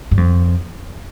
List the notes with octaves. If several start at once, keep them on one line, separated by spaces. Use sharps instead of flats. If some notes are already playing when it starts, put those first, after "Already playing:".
G2
F2